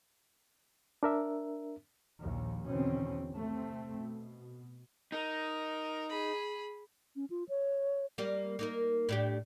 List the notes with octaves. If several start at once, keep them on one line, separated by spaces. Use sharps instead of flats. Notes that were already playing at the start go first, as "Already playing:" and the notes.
D4 A#4 E5
A#1 D#2
E2 B2 D3 D#3 C4 C#4
C3 A3 C4
B2
D#4 A#4
G#4 B5
C#4
F4
C#5
G3 A#3
A#3 D#4 A#4
A2 D4 G4